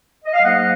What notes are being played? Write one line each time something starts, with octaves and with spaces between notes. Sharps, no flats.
D#5
F5
G#2 F#3 A#3 D#5 F#5